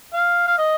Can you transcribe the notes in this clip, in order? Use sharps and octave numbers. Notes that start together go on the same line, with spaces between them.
F5
F5
D#5